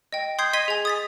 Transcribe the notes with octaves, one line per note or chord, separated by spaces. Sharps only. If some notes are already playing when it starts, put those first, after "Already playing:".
D#5 G5
C6 D#6 G6 G#6 C7
D#5 C6 G#6 B6 D#7 G7
G#4 G#5
D#6 A6 B6